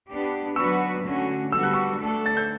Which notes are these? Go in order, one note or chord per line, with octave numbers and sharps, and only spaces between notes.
B3 D4 G4
F#3 B3 D4 F#4 B4 C#6 E6
D3 F#3 A3 C#4 F#4
D3 G3 B3 F#4 A4 E6
F#6
C#6 E6
A3 D4 A4
A6
G6